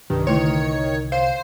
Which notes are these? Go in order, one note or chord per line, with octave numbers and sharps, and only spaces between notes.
C2 G2 D#3
D3 A3 E4 C#5
C5 F5